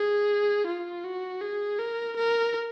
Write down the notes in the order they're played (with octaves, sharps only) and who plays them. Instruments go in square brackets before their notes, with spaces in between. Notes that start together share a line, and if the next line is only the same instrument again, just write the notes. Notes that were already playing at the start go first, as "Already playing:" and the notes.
Already playing: [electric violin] G#4
F4
F#4
G#4
A#4
A#4